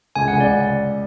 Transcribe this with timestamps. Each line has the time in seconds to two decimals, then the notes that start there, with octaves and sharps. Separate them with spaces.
0.16 C#2 G#5
0.28 C#2 F#5
0.40 D5